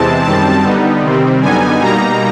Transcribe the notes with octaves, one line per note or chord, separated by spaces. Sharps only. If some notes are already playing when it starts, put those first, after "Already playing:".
Already playing: E2 C3 E3 G#3 C4 A5
F#2 D#3 G3 C4 A5
D3 G3 B3 D#4
C3 D#3 G3 C4
F#2 D3 G3 B3 D#4 G#5
B2 G3 A#3 D#4 A#5